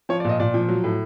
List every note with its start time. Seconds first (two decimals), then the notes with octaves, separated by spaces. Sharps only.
0.09 F3 C#5
0.20 D5
0.24 A#2 D#5
0.40 A#2 D5
0.54 F3
0.69 F#3
0.84 A2